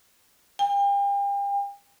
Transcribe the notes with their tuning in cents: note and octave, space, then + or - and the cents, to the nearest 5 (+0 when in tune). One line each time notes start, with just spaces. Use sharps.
G5 +40